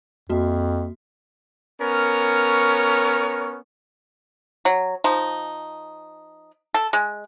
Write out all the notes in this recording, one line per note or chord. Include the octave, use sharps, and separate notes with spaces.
F2 A#3 F#4
B3 C#4 A#4 C#5
F#3
F3 D#4
A4
G#3